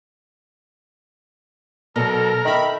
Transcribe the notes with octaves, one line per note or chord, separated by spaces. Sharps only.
B2 F#3 A4 A#4
D#3 A4 D#5 E5 B5